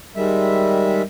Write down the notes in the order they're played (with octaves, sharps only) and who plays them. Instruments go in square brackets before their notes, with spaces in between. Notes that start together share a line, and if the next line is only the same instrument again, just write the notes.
[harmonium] D#3 G3 G#3 E5